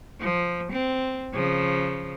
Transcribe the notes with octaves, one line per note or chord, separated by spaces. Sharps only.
F3
C4
C#3 F3